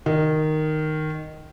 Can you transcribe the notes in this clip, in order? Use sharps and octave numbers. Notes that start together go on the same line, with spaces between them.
D#3